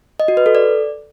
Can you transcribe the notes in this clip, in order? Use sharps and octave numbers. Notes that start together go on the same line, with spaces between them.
D#5
F#4
B4
A4
D5